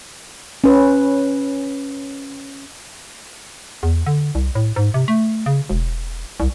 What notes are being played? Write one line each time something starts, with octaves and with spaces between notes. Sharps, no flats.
C#4 B4
E2
D3
C2
A2
G#2
C3
A3
C#3
E1
C2